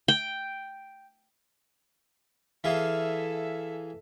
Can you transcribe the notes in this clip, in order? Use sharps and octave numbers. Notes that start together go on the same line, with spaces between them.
G5
E3 G#4 A4 E5 F5